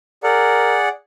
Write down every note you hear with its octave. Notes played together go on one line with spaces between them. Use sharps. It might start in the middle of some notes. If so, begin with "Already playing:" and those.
G#4 A#4 D5 F#5